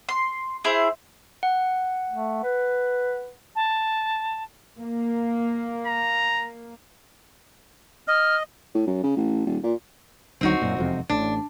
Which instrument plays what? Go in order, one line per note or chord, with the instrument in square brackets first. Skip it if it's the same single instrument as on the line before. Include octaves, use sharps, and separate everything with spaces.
[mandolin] C6
E4 G#4 C5
[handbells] F#5
[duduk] A3
B4
[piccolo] A5
[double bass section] A#3
[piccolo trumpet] A#5
[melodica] D#5 [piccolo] F6
[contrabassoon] A2
F#2
C#3
A1
D#1
A#2
[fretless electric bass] D#1 D2 F#3 [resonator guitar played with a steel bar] C4 D#4 F#4
[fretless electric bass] F#2 A#2
E1 F2 C3
[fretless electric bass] A1 A2 [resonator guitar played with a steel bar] D4